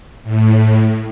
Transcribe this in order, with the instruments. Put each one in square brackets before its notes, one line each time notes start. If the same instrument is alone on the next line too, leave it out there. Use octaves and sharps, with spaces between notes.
[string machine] A2